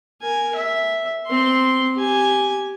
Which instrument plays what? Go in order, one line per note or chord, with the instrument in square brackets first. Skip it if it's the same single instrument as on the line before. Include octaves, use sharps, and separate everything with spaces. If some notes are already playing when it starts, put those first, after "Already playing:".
[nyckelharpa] A#4 G#5
E5
C4 C6
G4 G#5